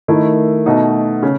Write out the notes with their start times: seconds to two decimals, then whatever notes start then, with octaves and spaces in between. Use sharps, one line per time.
0.08 D#3 A3 E4
0.66 B2 A3 D#4 F#4
1.23 C#3